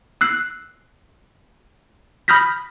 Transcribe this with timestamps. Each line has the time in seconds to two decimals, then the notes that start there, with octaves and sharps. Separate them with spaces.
0.21 E6 F#6 C7
2.28 B5 D#6 F6 G6 A#6 B6